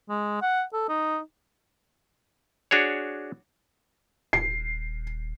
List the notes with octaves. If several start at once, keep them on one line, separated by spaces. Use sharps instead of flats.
G#3
F#5
A4
D#4
D4 F#4 G#4 C#5
D#1 C7